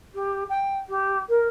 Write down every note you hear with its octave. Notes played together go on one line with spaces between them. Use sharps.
G4
G5
G4
A#4